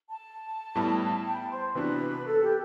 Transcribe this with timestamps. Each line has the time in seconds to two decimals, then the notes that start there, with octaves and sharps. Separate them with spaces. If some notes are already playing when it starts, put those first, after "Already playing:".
0.09 A5
0.75 A2 G3 B3 E4
1.25 G5
1.32 B5
1.37 A5
1.50 C5
1.75 C3 E3 B3 D4 F#4 B4
2.25 A4
2.41 G4